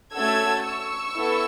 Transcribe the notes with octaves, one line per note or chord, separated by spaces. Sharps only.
A3 C#4 F#4 A4 E6 G#6
C#6 E6
B3 E4 A4